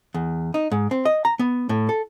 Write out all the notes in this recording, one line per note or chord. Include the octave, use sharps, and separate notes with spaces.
E2
D#4
G#2
C4
D#5
A#5
B3
A2
A4